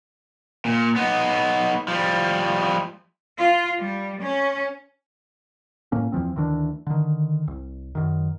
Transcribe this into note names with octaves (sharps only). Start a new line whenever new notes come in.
A#2
B3 D#4
F3 G3
F4
G3
C#4
A2 A#3 C#4
E2 E3 F3 C4
D2 D#3 E3 D4
D3 D#3
C2
F#2 D#3